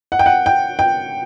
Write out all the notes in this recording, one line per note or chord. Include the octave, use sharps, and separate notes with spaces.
F#5
G5
F#5
G5
G5